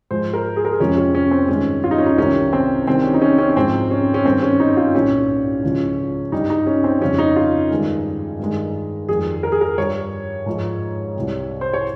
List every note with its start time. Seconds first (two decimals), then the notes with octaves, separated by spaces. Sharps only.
0.11 G#2 F3 G#3 C5
0.34 A#4
0.56 G#4
0.65 A#4
0.71 G#4
0.79 F2 C3 F3 G#3 C#4
0.97 C#4
1.15 C#4
1.31 C4
1.48 G2 D#3 G#3 C#4
1.84 F4
1.91 D#4
1.98 C#4
2.06 D#4
2.18 C2 C3 D#3 G3 C#4
2.53 C4
2.87 C2 C3 D#3 G3 C4
3.05 C#4
3.14 D#4
3.22 C#4
3.38 C#4
3.50 C#4
3.57 G#2 F3 G#3 C4
3.91 C#4
4.14 C#4
4.25 G2 D#3 G3 C4
4.42 C#4
4.60 D#4
4.77 F4
4.95 C2 A#2 G3 C#4
5.64 C#2 C#3 F3 G#3
6.32 G2 G3 D#4
6.50 D#4
6.67 C#4
6.84 C4
7.01 F2 C#3 G3 C#4
7.19 D#4
7.36 F4
7.71 G2 D#3 G#3
8.39 G2 D#3 G#3
9.09 F2 D#3 G3 G#4
9.43 A#4
9.52 G#4
9.61 A#4
9.78 G2 G3 C#5
10.46 G#2 F3 G#3
11.16 C2 C3 G3
11.61 C5
11.73 C#5